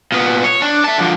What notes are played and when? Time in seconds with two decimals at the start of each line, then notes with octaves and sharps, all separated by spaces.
0.12 A#2 B3
0.44 C#5
0.62 D4
0.84 E5 A5
0.98 D3 F3